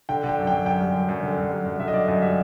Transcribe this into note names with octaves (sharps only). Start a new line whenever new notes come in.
D3 G5
D3
G5
F#2
G5
F#2
F#2 G5
G3
F#2
F#2
D3
F#2
G3
F#2
D3 E5
D#5
D3 D5
F#2 D#5
G3 E5